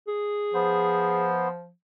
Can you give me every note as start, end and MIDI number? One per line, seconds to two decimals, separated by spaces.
0.08 1.31 68
0.54 1.70 53
0.54 1.48 59
0.54 1.48 72